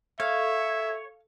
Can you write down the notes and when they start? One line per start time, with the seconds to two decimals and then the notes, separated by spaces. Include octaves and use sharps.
0.20 A4 C#5 E5 F5